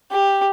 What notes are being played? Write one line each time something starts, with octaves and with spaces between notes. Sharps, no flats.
G4